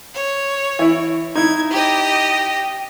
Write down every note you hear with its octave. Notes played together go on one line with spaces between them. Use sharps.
C#5
E3 E4
D#4 E4 G#6
G4 D#5